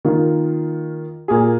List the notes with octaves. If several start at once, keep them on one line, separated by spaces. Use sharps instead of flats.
D#3 A#3 F4
A#2 A#3 G#4